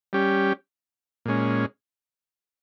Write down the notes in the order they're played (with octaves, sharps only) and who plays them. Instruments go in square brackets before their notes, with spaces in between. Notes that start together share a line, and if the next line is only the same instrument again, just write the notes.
[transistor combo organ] G3 C#4 G4
A#2 G#3 C#4